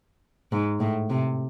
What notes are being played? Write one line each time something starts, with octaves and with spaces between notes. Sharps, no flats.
G#2
A2
C3